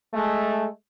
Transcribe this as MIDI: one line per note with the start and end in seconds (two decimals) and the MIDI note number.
0.13 0.65 56
0.13 0.65 57